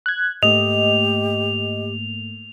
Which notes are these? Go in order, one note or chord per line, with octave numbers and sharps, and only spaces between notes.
F#6 G#6
G#2 A3 A#3 G4 D#5 F7